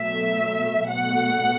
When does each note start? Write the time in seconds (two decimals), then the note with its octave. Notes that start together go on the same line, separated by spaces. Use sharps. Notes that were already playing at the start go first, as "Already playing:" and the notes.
Already playing: B2 F#3 A3 E5
0.89 B2 A3 F#5